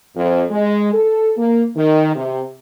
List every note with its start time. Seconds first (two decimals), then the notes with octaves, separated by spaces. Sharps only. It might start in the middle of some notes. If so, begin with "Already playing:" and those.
0.15 F2
0.51 G#3
0.93 A4
1.37 A#3
1.76 D#3
2.14 C3